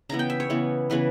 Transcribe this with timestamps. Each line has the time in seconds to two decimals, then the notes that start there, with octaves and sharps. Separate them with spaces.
0.09 C#3 E3 B3 A#5
0.19 G5
0.30 E5
0.40 C#5
0.50 C#3 E3 B3
0.90 C#3 E3 B3 B4